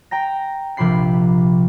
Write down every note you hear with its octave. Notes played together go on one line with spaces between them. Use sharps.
G5 A#5 A#6
A#1 C3 F3 G4 B5 C7